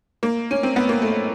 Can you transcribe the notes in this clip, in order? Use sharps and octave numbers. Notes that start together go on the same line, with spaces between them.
A#3
C#4
C4
B3
A#3
A3